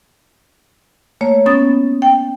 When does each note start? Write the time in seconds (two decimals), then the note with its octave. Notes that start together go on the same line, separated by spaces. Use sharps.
1.21 A3 A#3 C#5
1.46 B3 C#4 D#6 A6
2.02 G5